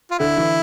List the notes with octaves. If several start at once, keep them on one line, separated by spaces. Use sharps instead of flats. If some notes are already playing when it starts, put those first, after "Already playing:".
F4
D3 E4
E3